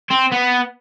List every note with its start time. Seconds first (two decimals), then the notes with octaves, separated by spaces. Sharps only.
0.10 C4
0.32 B3